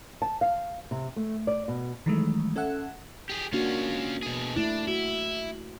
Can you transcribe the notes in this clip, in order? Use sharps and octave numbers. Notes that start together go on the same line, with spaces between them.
A5
F5
C3
A3
D5
B2
D#3 E3 F#3 G#3 A3
C#4 A4 E5 F#5
G4 G#4
A#3 C#4 D4 F4 F#4
B2 G#4
A3 D4 E4
E4 F#4